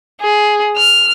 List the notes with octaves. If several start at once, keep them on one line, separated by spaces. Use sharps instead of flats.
G#4
F6